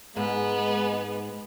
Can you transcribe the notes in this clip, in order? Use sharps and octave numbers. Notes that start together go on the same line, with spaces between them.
G#2 G#3 B3